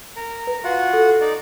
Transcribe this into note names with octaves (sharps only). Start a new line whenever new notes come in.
A#4
B4
F4 F#4 F5 F#5
A4
D#4 D5